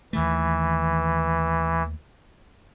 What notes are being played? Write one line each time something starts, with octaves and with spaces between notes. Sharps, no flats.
D#2 D#3 E3 A3